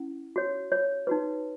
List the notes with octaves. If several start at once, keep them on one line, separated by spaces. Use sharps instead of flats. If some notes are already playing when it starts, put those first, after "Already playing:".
Already playing: C#4 E4
F#4 C#5
C#5
D#4 F#4 B4